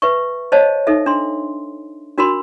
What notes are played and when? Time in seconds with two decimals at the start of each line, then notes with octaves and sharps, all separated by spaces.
0.02 B4 E5 C#6
0.52 C5 C#5 D#5 F5 A5
0.87 D#4 A4 E5
1.06 D4 C6
2.18 D4 F#4 A#4 B5 C6